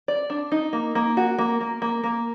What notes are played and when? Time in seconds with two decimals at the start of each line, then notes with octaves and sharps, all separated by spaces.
0.08 D5
0.30 D4
0.52 D#4
0.73 A#3
0.95 A#3
1.17 F#4
1.38 A#3
1.61 A#3
1.82 A#3
2.03 A#3